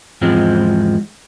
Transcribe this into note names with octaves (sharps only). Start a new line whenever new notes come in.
E2 G#2 F3 G#3 C4